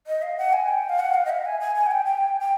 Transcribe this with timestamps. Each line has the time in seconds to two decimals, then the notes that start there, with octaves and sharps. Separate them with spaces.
0.07 D#5
0.22 F5
0.38 F#5
0.53 G#5
0.68 G5
0.89 F5
0.99 F#5
1.14 F5
1.25 D#5
1.30 E5
1.45 G#5
1.60 G#5
1.75 G#5
1.86 F#5
1.91 G5
2.06 G5
2.40 G5